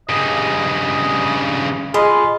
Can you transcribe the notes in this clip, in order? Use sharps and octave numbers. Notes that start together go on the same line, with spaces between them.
G2 C#3 D#5
F4 G#4 D#5 B5